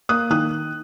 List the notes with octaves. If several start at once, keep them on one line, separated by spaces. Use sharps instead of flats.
A#3 D#6 F#6
D#3 D#6 F#6